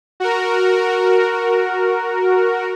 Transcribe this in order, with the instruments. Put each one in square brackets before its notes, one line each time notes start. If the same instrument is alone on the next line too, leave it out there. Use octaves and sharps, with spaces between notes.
[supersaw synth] F#4 A#4